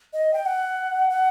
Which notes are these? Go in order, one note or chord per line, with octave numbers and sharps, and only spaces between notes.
D#5
G5
F#5
F#5